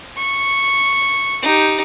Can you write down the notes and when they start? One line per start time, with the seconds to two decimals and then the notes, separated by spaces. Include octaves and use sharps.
0.17 C#6
1.42 D#4 G4